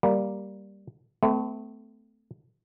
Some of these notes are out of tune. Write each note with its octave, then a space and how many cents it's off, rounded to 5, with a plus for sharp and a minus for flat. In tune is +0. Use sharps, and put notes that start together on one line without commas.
G3 +0 A#3 +5
A3 +0 C4 -45